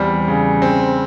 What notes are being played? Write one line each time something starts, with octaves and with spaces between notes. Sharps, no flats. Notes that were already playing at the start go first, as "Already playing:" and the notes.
Already playing: E2 G3 C4
C#3
C4